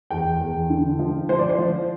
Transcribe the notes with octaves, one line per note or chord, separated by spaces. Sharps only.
E2 G5
E2
D3
F3
F3 C5
D5
C5
F3